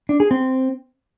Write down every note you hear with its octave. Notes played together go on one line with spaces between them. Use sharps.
D4
G#4
C4